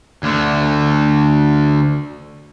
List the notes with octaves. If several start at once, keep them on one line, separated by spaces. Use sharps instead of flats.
D2 D3